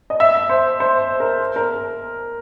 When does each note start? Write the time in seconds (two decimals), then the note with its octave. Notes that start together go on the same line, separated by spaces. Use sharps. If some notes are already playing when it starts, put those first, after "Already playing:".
0.10 D#5
0.20 E5
0.35 E5
0.49 C5
0.80 C5
1.20 A#4
1.56 A#4